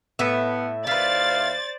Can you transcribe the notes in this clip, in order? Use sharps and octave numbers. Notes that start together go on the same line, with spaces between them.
A2 B3 E5
D#2 E4 B4 C5 D5 F5 A6